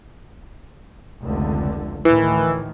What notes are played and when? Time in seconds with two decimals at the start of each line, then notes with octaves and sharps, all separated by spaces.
1.23 F1 C#2 D3
2.05 D2 A2 D#3 E3